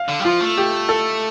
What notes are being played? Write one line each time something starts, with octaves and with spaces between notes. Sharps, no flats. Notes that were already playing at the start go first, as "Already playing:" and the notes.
Already playing: F5
D3
G3
F3 F4
A3
G4
A4